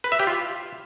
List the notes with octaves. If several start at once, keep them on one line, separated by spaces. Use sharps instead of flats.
B4
E5
G4
F4